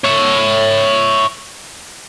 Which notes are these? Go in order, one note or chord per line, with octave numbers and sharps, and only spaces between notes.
C#5 E5